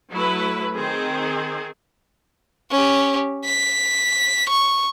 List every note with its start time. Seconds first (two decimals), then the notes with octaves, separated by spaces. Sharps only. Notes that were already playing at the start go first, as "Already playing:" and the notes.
0.12 F#3 A3 E4 B4
0.74 D#3 C4 G#4
2.71 C#4 G4
3.45 B6
4.49 C#6